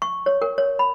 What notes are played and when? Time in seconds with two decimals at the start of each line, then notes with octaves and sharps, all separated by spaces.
0.02 C#6
0.26 C#5
0.42 A#4
0.58 C#5
0.79 B5